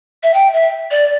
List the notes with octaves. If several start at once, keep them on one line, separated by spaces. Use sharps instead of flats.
E5
G5
E5
D5